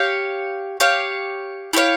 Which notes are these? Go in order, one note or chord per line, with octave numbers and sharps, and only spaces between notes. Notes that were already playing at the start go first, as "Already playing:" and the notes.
Already playing: G4 C#5 F5
G4 C#5 F5
E4 G4 C#5 F5